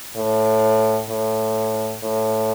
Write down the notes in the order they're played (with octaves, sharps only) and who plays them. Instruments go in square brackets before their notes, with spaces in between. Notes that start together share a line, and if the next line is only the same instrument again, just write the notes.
[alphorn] A2
A2
A2